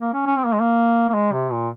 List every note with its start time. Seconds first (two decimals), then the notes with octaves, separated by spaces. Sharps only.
0.01 A#3
0.14 C#4
0.26 C#4
0.38 C4
0.46 A#3
0.53 G#3
0.60 A#3
1.09 A#3
1.14 G#3
1.33 C3
1.52 A#2